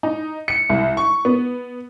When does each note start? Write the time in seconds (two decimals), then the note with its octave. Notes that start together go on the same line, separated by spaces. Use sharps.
0.03 D#4
0.48 C#7
0.69 C2
0.97 C#6
1.25 B3